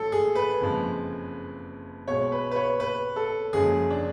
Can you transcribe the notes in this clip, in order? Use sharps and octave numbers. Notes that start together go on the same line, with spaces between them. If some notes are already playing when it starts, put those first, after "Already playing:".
Already playing: A1 A2 F#3 A4
G#4
B4
F#1 F2 F3 G#3
B1 B2 G#3 C#5
B4
B4
C#5
B4
A4
F#1 F#2 F3 G#3 G#4
D4